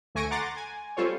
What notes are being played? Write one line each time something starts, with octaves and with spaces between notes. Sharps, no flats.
D2 A3 G#5 C#6 A#6 D7
F#5 A#5 C6 D6 A6
G#5
G3 C4 F4 A4 C5 C#5